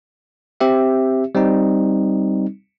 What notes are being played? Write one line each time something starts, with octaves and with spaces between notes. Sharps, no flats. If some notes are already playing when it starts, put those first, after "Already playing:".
C4 G4 E5
G3 C4 D#4